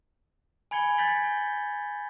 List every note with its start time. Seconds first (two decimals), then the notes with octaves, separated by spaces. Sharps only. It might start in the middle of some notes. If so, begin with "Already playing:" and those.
0.71 G#5 B5 G#6 C#7 G7
0.97 G#5 G6 A6 B6 F#7 G7